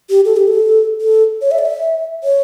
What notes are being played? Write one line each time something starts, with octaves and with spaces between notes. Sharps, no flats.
G4
A4
G4
A4
A4
C#5
E5
D5
E5
C#5